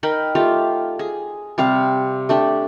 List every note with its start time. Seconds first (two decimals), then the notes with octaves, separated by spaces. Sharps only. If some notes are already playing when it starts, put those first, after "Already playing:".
0.03 D#4 A#4 G5 B5
0.35 A3 F4 G4 F5
0.99 G#4
1.58 C3 G3 F5
2.29 A3 D4 G4